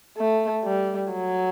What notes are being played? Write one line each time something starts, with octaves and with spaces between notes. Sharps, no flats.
A3
G3
F#3